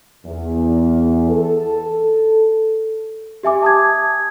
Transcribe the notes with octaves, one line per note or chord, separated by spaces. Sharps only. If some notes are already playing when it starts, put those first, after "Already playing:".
E2
A4
G4 E5 G#5 D6
A5 D#6 G#6